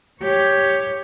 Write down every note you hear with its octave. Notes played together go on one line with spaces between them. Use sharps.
G4 C#5